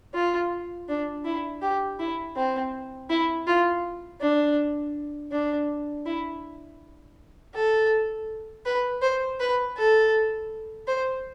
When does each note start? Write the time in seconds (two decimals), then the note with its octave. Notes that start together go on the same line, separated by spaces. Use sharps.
0.14 F4
0.88 D4
1.25 E4
1.61 G4
1.99 E4
2.36 C4
3.10 E4
3.47 F4
4.21 D4
5.32 D4
6.06 E4
7.54 A4
8.66 B4
9.02 C5
9.40 B4
9.77 A4
10.87 C5